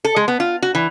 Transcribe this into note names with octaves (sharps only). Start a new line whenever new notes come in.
A4
G#3
B3
F4
F#4
E3